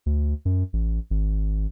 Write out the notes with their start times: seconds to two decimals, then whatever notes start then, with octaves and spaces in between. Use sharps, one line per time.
0.06 D2
0.45 F#2
0.73 A1
1.10 G#1